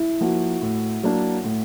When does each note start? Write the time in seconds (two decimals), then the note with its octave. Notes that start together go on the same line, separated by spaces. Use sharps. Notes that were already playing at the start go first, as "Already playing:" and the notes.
Already playing: E4
0.21 F3 A#3 F#4
0.62 A2
1.03 F#3 A#3 D4
1.44 A2